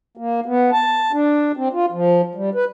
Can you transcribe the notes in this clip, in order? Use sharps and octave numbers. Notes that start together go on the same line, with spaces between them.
A#3
B3
A5
D4
C4
F4
F3
G3
B4